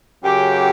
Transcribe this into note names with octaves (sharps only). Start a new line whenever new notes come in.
F#2 C#3 F#3 G4